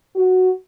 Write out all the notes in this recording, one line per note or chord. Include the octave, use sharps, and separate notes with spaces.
F#4